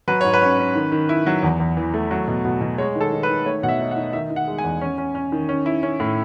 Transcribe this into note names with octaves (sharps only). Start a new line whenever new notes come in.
F#3 B4
G#2 C#5
B4
C#4
C#4
D#3
D#3
E4
F#3
E2
E2
E3
A3
F#3
B2
B2
B2
G#3 C#5
D#3
A4
D#3
B4
D#3
A3 C#5
B2 F#5
E5
D#4
F#5
D#4
D#3 E5
D#3
F#5
G#3
G#5
E2
C#4
C#4
C#4
D#3
C#4
E4
C#4
A2